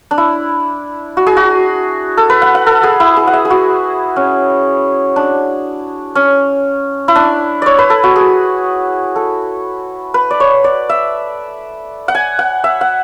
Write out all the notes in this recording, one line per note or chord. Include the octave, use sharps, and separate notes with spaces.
D4
E4
F#4
G#4
F#4
A4
B4
F#5
F#5
A4
G#4
E4
G#4
F#5
E5
G#4
F#4
C#4
D4
C#4
E4
D4
C#5 D5
B4
A4
F#4
G#4
A4
B4
D5
C#5
D5
E5
F#5
G#5
F#5
E5
F#5